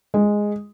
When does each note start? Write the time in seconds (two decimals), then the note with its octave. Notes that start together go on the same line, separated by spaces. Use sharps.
0.14 G#3